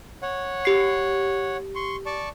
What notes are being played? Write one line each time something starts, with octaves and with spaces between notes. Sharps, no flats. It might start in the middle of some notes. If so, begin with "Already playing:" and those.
C#5 F#5
G4 C7
C6 C#6
D5 A5 C#6